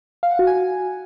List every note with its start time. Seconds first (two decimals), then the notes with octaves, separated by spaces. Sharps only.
0.23 F5
0.31 F#5
0.39 F#4
0.47 G#5